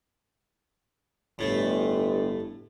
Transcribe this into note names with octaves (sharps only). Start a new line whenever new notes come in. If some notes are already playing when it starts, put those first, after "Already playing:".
G1 A2 A3